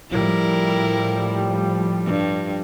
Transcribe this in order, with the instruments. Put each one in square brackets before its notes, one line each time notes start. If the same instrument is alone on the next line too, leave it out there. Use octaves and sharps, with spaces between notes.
[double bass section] A2 F3 G3 [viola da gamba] E4 A#4
[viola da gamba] G2